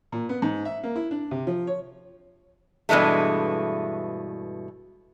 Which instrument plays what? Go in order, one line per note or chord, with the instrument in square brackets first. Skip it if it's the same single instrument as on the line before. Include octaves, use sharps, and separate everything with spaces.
[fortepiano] A#2
B3
G#2
E5
A#3
E4
D4
C3
F3
C#5
[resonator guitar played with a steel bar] G2 B2 E3 G#3 A3